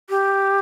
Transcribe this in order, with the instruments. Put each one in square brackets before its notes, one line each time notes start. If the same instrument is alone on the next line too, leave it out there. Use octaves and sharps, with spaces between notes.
[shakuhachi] G4